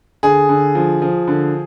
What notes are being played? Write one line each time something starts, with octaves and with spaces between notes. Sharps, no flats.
D3 G#4
D3
F3
F3
D3